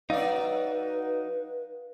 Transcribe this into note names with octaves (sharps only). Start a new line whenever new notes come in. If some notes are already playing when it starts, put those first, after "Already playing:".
F#3 D#4 B4 D5 F5